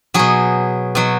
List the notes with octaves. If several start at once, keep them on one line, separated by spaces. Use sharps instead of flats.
B2 F#3 G#4
B2 F#3